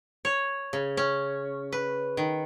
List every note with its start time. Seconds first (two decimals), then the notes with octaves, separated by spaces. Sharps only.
0.25 C#5
0.73 C#3
0.97 C#4
1.72 B4
2.17 D#3